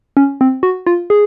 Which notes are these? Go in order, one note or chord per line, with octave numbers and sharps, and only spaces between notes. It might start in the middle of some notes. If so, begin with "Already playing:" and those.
C#4
C4
F#4
F4
G#4